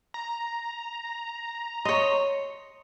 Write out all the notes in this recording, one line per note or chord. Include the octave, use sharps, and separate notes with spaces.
A#5
C#5 D#5 C6